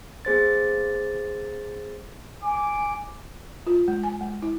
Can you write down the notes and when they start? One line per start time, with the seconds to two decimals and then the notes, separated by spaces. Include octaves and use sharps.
0.25 B3 G#4 C5 A6
2.43 G#5 D6
3.67 F4
3.88 G#3
4.03 G#5
4.21 G#3
4.42 E4